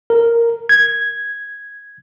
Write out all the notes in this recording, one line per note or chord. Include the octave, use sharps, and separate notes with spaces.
A#4
G#6